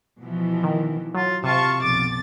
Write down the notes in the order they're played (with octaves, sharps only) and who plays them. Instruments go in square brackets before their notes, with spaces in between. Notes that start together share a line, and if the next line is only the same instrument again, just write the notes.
[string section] B2 E3 F3
[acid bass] D#3
[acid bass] F#3 [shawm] F4
[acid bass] C3 [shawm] F4 [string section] F5 A5 C#6
[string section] B1 F2 A6 [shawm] D6